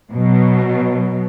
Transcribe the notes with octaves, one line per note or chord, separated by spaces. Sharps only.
B2 F#3